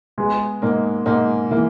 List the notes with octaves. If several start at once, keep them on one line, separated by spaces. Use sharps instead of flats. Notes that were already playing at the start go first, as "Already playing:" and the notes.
G#3 B3
G#2 A#3
G#2 A#3
E3 A#3